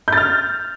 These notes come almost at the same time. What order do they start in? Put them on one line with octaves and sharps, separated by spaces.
G6 A6 F6